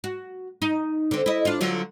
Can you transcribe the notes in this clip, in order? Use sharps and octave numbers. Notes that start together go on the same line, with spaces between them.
F#4
D#4
D3 C4
E4 D#5
D4 F4
D3 F#3 F4